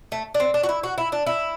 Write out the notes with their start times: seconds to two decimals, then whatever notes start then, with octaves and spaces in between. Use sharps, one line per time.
0.12 A3
0.34 D4
0.40 C4
0.54 D4
0.63 F#4
0.69 E4
0.83 F#4
0.98 E4
1.12 D4
1.26 E4